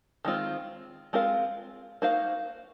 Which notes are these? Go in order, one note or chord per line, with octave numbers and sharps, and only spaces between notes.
D#3 G#3 C4 F4
G#3 C4 F4 A#4 F5
A#3 D#4 F#4 C5 F5